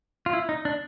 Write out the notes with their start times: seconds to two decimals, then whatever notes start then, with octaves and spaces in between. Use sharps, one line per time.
0.26 F4
0.33 E4
0.49 D#4
0.65 D4